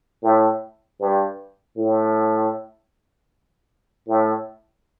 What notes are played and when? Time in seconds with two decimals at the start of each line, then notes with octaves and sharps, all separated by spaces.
0.23 A2
1.00 G2
1.78 A2
4.08 A2